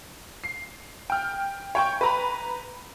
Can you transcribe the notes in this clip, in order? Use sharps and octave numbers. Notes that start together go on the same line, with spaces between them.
C7
G5 F6
C#5 G5 C#6
B4 A#5 B5